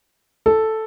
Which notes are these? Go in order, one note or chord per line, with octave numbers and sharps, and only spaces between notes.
A4